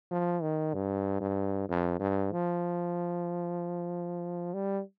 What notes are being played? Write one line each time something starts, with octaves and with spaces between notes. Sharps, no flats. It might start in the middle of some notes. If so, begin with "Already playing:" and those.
F3
D#3
G2
G2
F2
G2
F3
G3